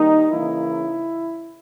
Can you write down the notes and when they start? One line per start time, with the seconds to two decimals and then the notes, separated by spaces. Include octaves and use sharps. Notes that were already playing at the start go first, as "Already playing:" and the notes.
Already playing: D#3 G3 A#3 D#4
0.31 C#3 E3 A#3 E4